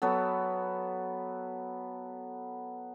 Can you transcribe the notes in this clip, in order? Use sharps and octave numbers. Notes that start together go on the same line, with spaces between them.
F#3 B3 A4